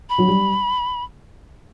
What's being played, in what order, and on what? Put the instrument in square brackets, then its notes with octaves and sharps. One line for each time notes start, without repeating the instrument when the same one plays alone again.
[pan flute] B5
[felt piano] F#3
G3